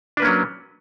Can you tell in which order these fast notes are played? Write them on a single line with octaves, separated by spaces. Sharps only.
D4 B4 A#3 C#4 F#3